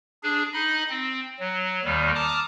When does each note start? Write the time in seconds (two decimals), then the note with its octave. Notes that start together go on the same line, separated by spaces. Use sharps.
0.23 D4 G#4
0.53 D#4 D#5 B5
0.90 C4
1.39 F#3
1.85 D#2 D#3 G3
2.15 A5 A#5 D6 D#6 F6